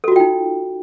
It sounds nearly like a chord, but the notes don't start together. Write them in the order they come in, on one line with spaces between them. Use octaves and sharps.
A4 F#4 F4 G5 D#4